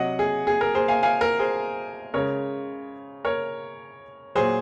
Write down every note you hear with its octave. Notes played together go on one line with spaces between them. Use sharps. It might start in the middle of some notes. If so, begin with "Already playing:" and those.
Already playing: C3 F#3 D#5 F#5
G#4
G#4
A#4
G#4 C5
F5 G#5
F5 G#5
A#4
G#4 C5
C#3 G#3 A#4 C#5
A#4 C#5
A#2 F#3 G#4 C5